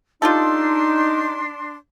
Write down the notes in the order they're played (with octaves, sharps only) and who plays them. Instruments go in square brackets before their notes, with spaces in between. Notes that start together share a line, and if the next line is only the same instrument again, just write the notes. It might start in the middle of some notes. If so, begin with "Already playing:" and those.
[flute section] D4 C6 [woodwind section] D#4 [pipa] F4 G4 A4